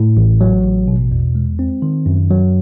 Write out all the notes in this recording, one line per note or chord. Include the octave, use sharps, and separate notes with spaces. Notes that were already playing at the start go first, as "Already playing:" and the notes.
Already playing: A2
A1
F#3
A1
B2
E2
G#3
C4
D#3
F#2
F#3